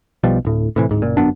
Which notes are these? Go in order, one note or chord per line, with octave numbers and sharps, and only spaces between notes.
B1 B2 F3 G3
D1 A2
A2 C3 E3
D1 G#2
F#1 A#2
G1 F#2 B3 D4